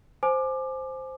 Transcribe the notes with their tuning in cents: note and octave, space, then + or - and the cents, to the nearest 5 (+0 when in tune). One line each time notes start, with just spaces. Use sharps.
C5 +0 G#5 +30 D6 +25